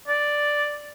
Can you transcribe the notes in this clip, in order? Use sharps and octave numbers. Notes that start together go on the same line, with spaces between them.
D5